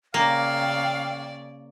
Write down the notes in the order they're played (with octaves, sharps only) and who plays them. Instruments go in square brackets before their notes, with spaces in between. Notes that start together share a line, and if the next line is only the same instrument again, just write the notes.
[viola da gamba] C#3 D5 [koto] A#3 [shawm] F5 [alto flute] G5